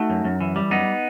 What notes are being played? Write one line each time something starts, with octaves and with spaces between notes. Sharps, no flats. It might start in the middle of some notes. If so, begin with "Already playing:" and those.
Already playing: A3 D#4 F#4
F#2
F#2
E3
G3
F#2 B3 D#4